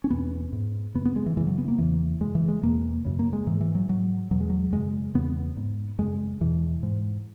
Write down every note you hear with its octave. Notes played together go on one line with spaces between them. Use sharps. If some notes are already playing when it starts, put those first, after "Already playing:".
C#4
E2 B2 B3
G#2
F#2 C#3 B3
B3
G#3
E3
F#2 C#3 E3
F#3
B3
A#3
E2 C#3 E3
F#2 C#3 G#3
E3
G#3
E2 B2 A#3
F#2 C#3
A#3
G#3
G#2 E3
E3
F#3
G#2 F#3
E2 B2 F#3
G#3
F#3
F#2 C#3 G#3
E2 C#3 B3
G#2
F#2 C#3 G#3
E2 B2 E3
G#2